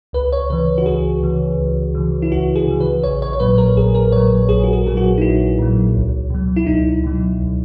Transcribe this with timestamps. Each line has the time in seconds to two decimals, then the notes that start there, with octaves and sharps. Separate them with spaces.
0.13 C#2 B4
0.32 C#5
0.50 C#3 E3 B4
0.78 F#4
0.86 C#2 G#4
1.23 C#3 E3
1.59 C#2
1.95 C#3 E3
2.22 E4
2.31 C#2 F#4
2.56 G#4
2.68 C#3 E3
2.80 B4
3.03 A#1 C#5
3.22 C#5
3.33 C#5
3.40 A#2 F#3 B4
3.58 A#4
3.76 A#1 G#4
3.95 A#4
4.12 A#2 F#3 C#5
4.49 A#1 G#4
4.64 F#4
4.73 G#4
4.86 A#2 F#3 G#4
4.97 F#4
5.18 D#4
5.21 A#1 E4
5.59 A#2 F#3
5.95 C#2
6.30 B2 F#3
6.56 E4
6.66 C#2 D#4
7.04 B2 F#3
7.39 C#2